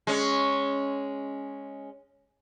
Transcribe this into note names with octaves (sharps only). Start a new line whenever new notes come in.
G#3 C#4